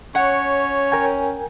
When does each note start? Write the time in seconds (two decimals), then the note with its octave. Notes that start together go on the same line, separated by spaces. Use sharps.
0.15 C#4 C#5 F#5
0.92 A#4 G5 G#5